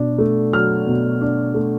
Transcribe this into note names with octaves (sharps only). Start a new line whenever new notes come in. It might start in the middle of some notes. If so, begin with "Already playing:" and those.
Already playing: B2 D4
A3
F#3 F6
B2
D4
A3